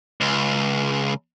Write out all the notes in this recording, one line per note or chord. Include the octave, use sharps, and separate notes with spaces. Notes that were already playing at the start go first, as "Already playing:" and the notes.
C#2